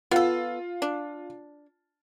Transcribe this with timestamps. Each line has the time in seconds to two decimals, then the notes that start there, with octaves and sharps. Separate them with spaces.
0.11 B3 F4 A4
0.82 D4